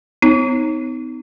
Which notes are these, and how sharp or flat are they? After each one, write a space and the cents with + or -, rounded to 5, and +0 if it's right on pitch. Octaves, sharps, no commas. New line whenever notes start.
B3 +45 D#4 +15 C#5 -30